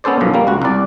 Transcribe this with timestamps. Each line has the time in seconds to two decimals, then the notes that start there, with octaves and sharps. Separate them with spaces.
0.04 B3 C#4 A4 C5 D5
0.21 B1 F#2 F3
0.34 G3 A#3
0.47 C#2 F#4
0.62 C2 D5